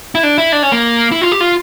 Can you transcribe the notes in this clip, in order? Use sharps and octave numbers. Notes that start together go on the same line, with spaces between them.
E4
D4
E4
D4
C#4
A#3
E4
F4
G4
F4